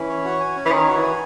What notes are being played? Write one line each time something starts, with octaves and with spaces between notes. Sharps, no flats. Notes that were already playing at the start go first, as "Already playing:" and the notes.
Already playing: E3 C#4
C#5
F#4
G#5
C#4
E3
D#3 C#5
F#4
E3
G#5